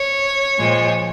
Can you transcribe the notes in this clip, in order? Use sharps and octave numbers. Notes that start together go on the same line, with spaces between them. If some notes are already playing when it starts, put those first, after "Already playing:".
Already playing: C#5
A#2 F3 G#3